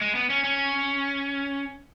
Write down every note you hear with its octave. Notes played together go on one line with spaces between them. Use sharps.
G#3
B3
C#4
C#4